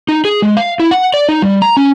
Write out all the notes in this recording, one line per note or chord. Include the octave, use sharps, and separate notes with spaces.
D#4
G#4
G#3
F5
E4
F#5
D5
D#4
G3
A#5
C#4